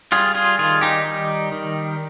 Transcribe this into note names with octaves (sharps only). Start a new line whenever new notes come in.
G3 F4 G#4
F4 G#4
D#3 F4 G#4
D#4 G4
G3
D#3